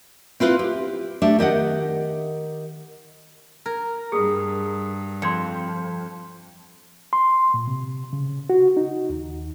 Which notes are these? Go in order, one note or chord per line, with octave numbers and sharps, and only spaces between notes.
C4 E4 F4 B4
G4
A3 D4 G4
D#3 G4 D#5 F#5
A#4 G#6
G2 G#4 D#6
F2 C6 G#6 C#7
C6
A#2
C3
C#3
F#4
D#4
D#2